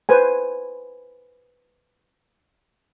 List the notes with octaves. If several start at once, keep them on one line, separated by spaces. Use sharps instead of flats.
B4 C5 G#5